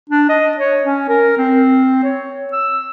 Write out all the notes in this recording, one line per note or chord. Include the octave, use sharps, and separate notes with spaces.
D4
D#5
C#5
C#4
A#4
C4
C#5
E6